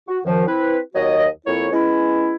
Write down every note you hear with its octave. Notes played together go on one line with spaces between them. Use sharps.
F#4
F#2 D#3 F3
C4 E4 B4
D#2 F#3 F#4 D#5
F2 A#3 E4 C#5
G#3 B3 C#4 E4